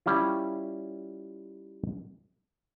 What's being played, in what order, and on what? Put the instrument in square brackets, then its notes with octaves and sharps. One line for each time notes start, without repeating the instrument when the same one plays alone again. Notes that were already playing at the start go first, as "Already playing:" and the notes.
[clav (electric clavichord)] G3 C#4 E4 F4